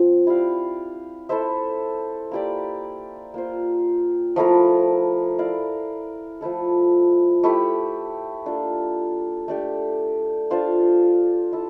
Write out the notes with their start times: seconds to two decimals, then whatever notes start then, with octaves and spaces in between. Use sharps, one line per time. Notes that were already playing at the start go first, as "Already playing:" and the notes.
Already playing: F3 C4
0.27 E4 G4 D5 F5
1.29 E4 A4 C5 E5
2.31 A#3 E4 G4 D5
3.34 A#3 F4 C5
4.36 F3 A3 E4 A#4
5.39 E4 A#4 D5 F5
6.41 F3 A3 E4 A4
7.44 A3 E4 G4
8.46 A#3 D4 F4 A4
9.48 A3 D4 G4
10.50 D4 F4 C5 F5
11.53 E4 A4 E5